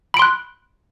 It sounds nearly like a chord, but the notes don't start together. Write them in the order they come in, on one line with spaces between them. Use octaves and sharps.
B5 D7 C6 F#6